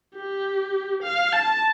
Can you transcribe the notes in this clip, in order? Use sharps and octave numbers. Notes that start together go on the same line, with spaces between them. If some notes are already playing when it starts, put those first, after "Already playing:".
G4
F5
A5